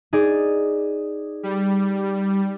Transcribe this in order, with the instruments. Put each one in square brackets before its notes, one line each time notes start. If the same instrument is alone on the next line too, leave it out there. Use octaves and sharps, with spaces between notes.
[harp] D#4 G#4 D5
[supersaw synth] G3